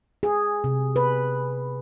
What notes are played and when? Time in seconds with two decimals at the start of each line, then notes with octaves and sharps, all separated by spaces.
0.23 G#4
0.64 C3
0.96 B4